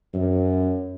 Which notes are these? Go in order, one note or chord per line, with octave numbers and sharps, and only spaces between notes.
F#2